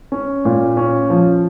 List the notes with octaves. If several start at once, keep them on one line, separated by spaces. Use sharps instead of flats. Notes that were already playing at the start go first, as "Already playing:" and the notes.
C#4
A#2
C#4
F3